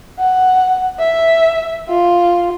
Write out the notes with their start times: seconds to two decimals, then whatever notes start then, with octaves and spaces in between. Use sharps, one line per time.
0.19 F#5
0.99 E5
1.89 F4